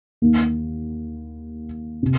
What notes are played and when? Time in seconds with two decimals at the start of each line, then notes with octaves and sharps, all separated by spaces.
0.22 D#2 D#3 A#3
2.03 C3